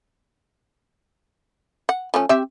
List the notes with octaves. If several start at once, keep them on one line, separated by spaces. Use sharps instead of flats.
F#5
F3 A3 C#4
C4 G4 E5